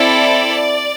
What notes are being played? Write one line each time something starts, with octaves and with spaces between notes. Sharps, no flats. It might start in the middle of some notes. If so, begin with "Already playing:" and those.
Already playing: C4 E4 A4 D5